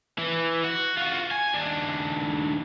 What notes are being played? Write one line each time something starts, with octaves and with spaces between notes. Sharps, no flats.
E3
F#4
F4 F#4
G#5
D#2 D4